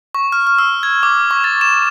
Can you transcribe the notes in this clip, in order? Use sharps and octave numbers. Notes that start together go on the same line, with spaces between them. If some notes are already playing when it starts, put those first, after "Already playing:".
C#6
F6
F6
E6
G#6
D6
C#6
A6
E7